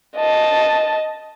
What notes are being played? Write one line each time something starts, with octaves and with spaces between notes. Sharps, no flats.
D#5 A5